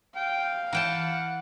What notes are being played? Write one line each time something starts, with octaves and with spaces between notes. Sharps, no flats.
F5 G5
E3 F#5 G5 A5